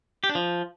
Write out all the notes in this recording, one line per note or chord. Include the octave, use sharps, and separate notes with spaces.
G4
D4
F3